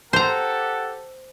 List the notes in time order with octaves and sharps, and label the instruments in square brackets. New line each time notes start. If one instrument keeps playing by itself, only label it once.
[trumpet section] G4 A4 F#5 [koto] C5 A#5